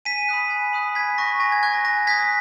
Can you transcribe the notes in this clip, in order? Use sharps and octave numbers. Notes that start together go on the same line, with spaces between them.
G#5 B6 D#7
B5 D#6 F#6
G#5
B5 D#6 F#6
G#5 G#6 B6
C#6 F#6 A#6
G#5 A#6
G#6
C#6 F#6 G#6
A#6
G#5 A#6
D#6 F#6 G#6 B6